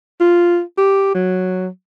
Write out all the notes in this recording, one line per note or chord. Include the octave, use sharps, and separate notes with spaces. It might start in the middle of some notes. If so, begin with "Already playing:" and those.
F4
G4
F#3